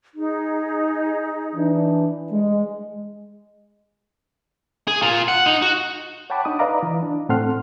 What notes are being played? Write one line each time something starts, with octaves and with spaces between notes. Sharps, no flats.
D#4 G#4
E3 D4
G#3
G#4
F4 A#4
F#5
D#4
F#4
C#5 F#5 G5 A5 B5 D6
D4 D#4 D#6
B4 D5 D#5 F5 A#5 D6
E3
D4
A2 C4 A4 F#5 C6 F6